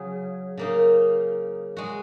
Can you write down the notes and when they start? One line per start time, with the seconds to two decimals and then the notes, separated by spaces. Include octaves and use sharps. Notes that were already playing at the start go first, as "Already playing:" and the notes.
Already playing: C#3 F#3 G#4
0.57 C#3 A#3 D#4
1.77 G#3 F#4